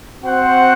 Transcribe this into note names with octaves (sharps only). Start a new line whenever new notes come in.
C4 F#4 C5 F#5